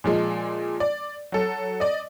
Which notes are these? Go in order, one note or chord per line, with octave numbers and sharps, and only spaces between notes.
A#2 F3 G#3
D5
F#3 A4
D5 D#5